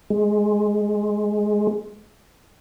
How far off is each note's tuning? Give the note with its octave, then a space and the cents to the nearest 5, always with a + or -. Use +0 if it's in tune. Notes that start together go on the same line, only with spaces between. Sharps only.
G#3 +0